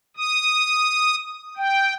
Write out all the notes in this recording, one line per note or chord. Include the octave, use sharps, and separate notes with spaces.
D#6
G5